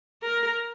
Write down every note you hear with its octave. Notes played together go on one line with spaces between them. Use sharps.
A#4